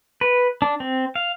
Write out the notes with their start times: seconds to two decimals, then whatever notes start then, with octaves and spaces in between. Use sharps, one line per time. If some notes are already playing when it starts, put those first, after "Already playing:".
0.21 B4
0.62 D4
0.80 C4
1.15 F5